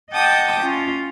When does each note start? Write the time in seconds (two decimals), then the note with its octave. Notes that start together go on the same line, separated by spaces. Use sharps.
0.12 D#5 F#5 G5 A5 D6 D#6
0.61 C#4 F4